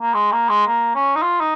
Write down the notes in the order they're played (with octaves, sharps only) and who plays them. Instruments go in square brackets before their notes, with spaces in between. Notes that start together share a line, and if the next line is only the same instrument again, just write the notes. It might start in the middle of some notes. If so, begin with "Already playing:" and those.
[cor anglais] A#3
G#3
A#3
G#3
A#3
C#4
D#4
F4
D#4